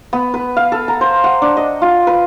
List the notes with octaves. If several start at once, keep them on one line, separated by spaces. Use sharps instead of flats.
B3
B4
F5
A4
A#5
C5
F#5
D4
D#5
F4
B4